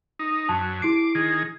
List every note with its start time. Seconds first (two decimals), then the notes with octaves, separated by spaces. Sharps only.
0.19 D#4
0.49 F#2 A5
0.82 E4 D6 C7
1.15 D#3 G#4